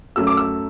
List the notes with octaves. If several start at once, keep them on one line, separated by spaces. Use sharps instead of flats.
F#2 F#3 A3 E6
D6
E6